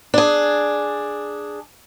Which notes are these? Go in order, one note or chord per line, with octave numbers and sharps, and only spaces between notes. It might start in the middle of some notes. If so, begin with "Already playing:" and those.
D4 G#4